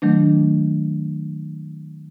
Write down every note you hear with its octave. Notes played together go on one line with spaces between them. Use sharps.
D#3 F#3 A3 D4